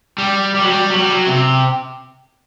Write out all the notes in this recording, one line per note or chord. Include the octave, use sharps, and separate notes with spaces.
G3
G3
F#3
G3
F#3
G3
F#3
C3